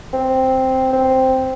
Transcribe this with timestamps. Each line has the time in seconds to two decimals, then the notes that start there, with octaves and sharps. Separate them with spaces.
0.13 C4
0.93 C4